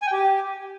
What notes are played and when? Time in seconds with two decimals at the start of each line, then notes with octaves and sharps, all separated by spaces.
0.02 G#5
0.07 G5
0.12 G4